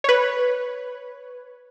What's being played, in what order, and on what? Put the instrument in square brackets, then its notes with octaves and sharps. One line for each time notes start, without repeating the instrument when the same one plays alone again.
[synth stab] B4 C#5